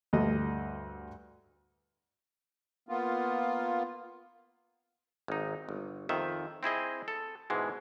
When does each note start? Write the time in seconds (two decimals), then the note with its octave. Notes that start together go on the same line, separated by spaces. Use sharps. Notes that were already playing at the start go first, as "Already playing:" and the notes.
0.13 D2 G2 A4 D#5
2.89 A#3 B3 F4
5.28 G#1 D#4
5.69 G1
6.09 F2 D#3 E5
6.63 C4 E4 G#4 D#5
7.08 A4
7.50 G#2 B2 E3 G#3